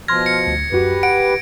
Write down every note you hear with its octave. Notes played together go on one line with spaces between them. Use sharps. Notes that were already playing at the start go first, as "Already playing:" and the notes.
B2 F3 C6 F6 G#6 A#6
C#7
D2
F#2 F#4 G4 B4
F#5 D7